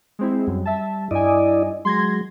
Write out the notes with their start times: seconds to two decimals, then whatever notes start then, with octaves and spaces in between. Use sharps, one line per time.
0.19 G#3 C4 E4
0.47 F#2 G3
0.65 E5 A5
1.11 G2 E4 D5 D#5 G#5
1.85 F#3 G#3 C6 G#6 A#6